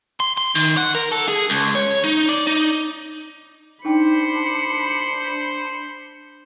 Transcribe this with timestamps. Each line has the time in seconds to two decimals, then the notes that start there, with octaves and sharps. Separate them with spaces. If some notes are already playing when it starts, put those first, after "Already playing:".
0.20 C6
0.37 C6
0.55 D#3
0.77 F#5
0.95 A#4
1.12 A4
1.28 G#4
1.50 C#2
1.75 C#5
2.04 D#4
2.29 D5
2.47 D#4
3.85 D4 D#4 C5 G5 B5 C#7